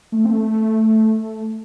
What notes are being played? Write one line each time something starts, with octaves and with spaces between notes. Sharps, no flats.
A3
C4
A3